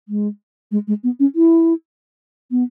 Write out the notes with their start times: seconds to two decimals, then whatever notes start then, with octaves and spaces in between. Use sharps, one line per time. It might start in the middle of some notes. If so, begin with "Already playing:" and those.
0.08 G#3
0.71 G#3
0.87 G#3
1.03 B3
1.19 C#4
1.35 E4
2.51 B3